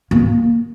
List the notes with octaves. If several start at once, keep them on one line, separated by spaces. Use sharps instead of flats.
A#3